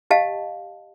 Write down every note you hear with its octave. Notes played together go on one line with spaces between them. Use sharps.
G4 D#5 F5 A5